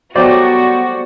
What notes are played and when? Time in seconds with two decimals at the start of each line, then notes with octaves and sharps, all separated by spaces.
0.15 F#3 G3 A3 B3 F#4 C5 D5 G5